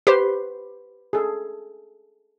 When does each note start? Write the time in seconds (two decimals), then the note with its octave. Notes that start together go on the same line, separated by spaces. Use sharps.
0.07 G4 B4 C5 C6
1.13 G#4 A4